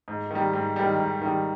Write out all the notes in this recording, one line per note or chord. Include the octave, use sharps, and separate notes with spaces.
G#2
D#3 G3
G#2
D#3 G3
G#2
D#3 G3